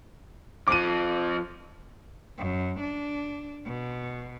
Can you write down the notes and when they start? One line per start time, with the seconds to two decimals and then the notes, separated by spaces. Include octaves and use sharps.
0.68 F2 F3 D6 D#7
2.38 F#2
2.80 D4
3.65 B2